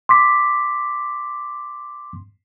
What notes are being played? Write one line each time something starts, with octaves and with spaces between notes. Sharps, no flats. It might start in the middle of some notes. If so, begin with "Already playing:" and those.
C6 D6 B6